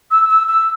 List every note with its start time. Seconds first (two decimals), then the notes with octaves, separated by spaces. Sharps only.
0.11 E6
0.29 E6
0.48 E6